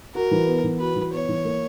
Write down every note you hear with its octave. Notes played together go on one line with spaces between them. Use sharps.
F#4 A#4
E3
B3
E3
F#4 B4
E3
B3 C#5
E3
A#3